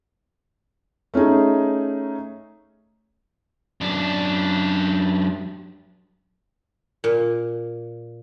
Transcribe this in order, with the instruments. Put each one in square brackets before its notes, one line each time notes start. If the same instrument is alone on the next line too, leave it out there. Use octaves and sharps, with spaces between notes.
[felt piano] A3 C#4 D#4 G#4
[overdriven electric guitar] F#2 D4
[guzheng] A#2